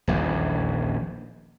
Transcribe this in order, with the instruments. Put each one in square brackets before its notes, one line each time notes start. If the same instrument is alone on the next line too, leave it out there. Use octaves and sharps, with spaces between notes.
[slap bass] D#1 A#1 E2